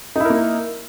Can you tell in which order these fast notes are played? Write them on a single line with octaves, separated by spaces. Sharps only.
D#4 E4 A#4 A#3